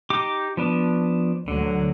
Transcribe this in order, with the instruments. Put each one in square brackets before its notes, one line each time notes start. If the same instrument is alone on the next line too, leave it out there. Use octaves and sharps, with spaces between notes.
[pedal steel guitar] D#4 G4 D6
F3 B3 D4
[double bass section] D2 F#3 [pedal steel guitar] D3